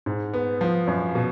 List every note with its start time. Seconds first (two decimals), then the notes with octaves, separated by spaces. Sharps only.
0.06 G#2
0.34 B3
0.61 F3
0.87 F#2
1.15 B2